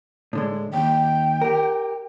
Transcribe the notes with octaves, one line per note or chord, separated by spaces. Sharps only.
A2 D3 G#3
D#2 G5
G4 A#4